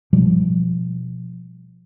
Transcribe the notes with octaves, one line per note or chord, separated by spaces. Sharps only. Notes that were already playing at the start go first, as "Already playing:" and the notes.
B2 F3 G3